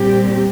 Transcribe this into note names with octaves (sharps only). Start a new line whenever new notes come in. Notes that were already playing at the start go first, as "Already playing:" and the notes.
Already playing: A#2 G3 C4 G4